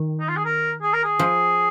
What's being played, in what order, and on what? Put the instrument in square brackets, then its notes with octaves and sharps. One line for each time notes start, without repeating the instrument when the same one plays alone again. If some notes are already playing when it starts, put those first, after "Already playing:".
Already playing: [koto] D#3
[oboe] D#4
F4
G#4
A#4
G#4
A#4
G#4
[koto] F3